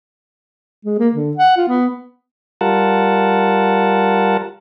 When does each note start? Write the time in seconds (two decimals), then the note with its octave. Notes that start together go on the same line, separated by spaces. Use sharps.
0.85 G#3
0.99 A#3
1.14 D3
1.37 F#5
1.57 F4
1.68 B3
2.61 G3 F4 A#4 F#5 A5